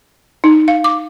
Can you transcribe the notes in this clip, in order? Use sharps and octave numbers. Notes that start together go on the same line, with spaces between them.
D#4
F5
D6